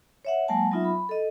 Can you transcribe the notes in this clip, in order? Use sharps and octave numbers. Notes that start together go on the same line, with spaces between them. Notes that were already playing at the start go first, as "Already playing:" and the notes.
C#5 E5 F#5
F#3 G#3 A#3 F#5 G#5 A5
F#3 B3 D#4 F4 E5
B5
A4 D#5